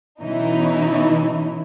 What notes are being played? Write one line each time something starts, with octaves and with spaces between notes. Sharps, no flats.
B2 E3 C#4 D#4 E4